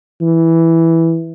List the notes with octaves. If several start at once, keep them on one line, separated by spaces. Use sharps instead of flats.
E3